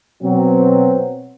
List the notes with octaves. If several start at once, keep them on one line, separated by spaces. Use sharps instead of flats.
B2 F#3 C4